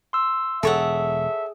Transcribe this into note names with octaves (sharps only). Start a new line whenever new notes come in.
C6 E6
E1 G#4 A4 C#5 E5 F#5